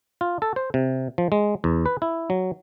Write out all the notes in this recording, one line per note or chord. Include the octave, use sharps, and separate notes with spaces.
F4
A4
C5
C3
F3
G#3
E2
B4
E4
F#3